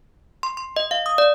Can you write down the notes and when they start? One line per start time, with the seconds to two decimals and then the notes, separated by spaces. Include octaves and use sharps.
0.43 C6
0.57 C6
0.76 D#5
0.91 F5
1.06 D#6
1.18 D5